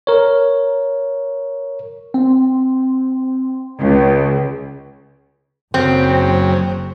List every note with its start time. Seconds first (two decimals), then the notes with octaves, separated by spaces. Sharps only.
0.07 A#4 C#5
2.14 C4
3.81 C#2
5.74 F#1 F#2 C#3 C4